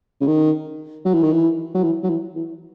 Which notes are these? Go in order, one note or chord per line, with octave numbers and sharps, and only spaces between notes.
C#3
D#3
F#3
E3
D#3
E3
F#3
E3
F#3
E3
E3